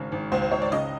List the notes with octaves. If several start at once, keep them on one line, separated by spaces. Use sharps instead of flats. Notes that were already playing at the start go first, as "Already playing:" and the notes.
Already playing: G#1 C#3
G#1
C#2 C5
C5
C#2 C#5
D5
C#3 D#5